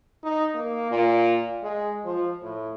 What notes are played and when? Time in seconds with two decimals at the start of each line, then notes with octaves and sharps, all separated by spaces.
0.23 D#4
0.54 A#3
0.91 A#2
1.63 G#3
2.05 F3
2.42 A2